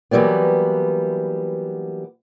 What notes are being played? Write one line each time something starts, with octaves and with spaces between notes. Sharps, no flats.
E3 F#3 G3 A#3 B3